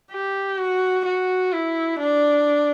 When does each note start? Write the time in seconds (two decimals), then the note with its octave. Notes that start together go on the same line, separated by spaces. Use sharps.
0.11 G4
0.58 F#4
1.05 F#4
1.53 E4
1.99 D4